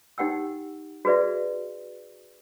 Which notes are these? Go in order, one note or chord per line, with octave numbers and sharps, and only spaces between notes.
D#4 G4 F#5 G5 E6
F#4 G#4 B4 D5 E5